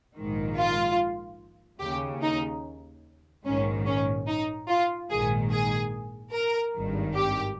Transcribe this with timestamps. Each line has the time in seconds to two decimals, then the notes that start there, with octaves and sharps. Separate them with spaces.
0.16 A#1 G#2 D#3
0.57 F4
1.80 D#2 C#3 G4
2.22 D#4
3.45 A#1 G#2 D#3 C#4
3.86 C#4
4.27 D#4
4.69 F4
5.10 A#1 G#2 D#3 G#4
5.51 G#4
6.33 A#4
6.74 G#1 G2 D#3
7.15 G4